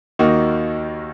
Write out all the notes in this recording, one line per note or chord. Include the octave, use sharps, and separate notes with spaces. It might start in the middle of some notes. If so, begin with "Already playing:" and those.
D#2 D#3 A#3 D#4 F#4